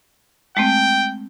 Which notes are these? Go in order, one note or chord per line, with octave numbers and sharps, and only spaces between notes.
G#3 A3 C4 G5